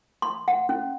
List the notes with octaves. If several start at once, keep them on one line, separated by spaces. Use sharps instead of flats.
C6
F#5
C#4